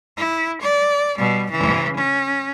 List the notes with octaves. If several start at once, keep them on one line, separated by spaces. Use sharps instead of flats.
E4
D5
B2 G3
C#3 E3
C#4